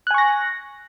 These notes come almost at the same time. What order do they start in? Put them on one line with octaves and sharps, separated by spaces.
F#6 G#5 C#6 A#6